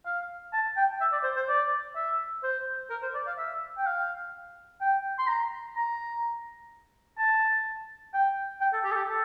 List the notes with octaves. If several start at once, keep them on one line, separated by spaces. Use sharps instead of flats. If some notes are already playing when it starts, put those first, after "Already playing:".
F5
A5
G5
E5
D5
C5
C5
D5
E5
C5
A#4
C5
D5
F5
E5
G5
F5
G5
C6
A#5
A#5
A5
G5
G5
A4
G4
A4
G4
A4